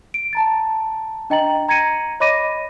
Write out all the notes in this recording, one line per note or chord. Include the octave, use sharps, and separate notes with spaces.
D7
A5 A#5 A6
D4 D#5 G5 A#5 A6 F#7
A#5 G#6 A#6 C#7 D#7
C#5 D#5 B5 D6 A#6 D#7